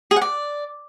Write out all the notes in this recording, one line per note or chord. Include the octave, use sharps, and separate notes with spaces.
G#4
F#5
D5